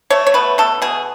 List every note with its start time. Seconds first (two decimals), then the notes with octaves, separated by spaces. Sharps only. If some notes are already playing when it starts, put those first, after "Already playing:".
0.10 A3 C#5
0.27 C#5
0.34 B2 B4
0.58 B2 A4
0.82 B2 G#4